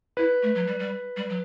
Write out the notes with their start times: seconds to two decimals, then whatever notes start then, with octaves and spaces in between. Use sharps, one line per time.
0.17 E4 B4
0.43 A3
0.55 F#3
0.67 G3
0.79 G3
1.17 G3
1.29 F#3